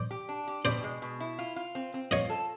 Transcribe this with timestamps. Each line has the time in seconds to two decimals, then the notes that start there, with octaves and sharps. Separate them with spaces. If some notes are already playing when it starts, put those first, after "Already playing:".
Already playing: C5 D5
0.11 G4
0.29 D4
0.47 G4
0.65 B2 C5 D5
0.84 G#3
1.02 B2
1.20 E4
1.39 F4
1.56 F4
1.75 C4
1.94 C4
2.11 F4 C#5 D#5
2.30 A4